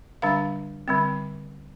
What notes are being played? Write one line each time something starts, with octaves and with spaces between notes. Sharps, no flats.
D3 G3 D4 F5
D3 G3 C4